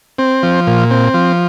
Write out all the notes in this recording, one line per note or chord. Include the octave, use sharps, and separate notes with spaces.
C4
F3
A#2
C4
F3